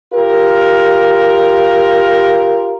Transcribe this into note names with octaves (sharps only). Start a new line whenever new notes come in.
F4 G4 A#4